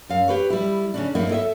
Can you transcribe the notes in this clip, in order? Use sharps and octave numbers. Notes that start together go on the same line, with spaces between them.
F#2 F5
G4 B4 C#5
G3 E4
C#3 C#4 D4
G2 A#3 D#4 E4
A4 D#5 E5